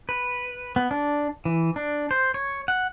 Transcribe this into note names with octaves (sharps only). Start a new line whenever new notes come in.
B4
B3
D4
E3
D4
C5
C#5
F#5